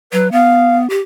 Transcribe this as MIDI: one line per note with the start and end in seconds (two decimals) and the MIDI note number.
0.13 0.32 54
0.13 0.31 71
0.32 0.89 59
0.32 0.78 77
0.90 0.99 67